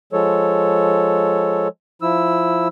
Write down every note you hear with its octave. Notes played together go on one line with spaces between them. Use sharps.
F3 G#3 A4 C#5
F3 E4 E6